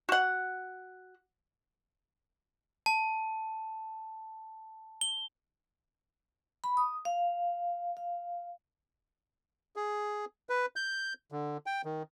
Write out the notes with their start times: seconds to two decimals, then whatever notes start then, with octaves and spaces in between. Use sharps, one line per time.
0.09 F#4 F#5
2.86 A5
5.01 G7
6.64 B5
6.77 D#6
7.05 F5
7.97 F5
9.76 G#4
10.49 B4
10.76 G6
11.32 D3
11.66 G5
11.85 D#3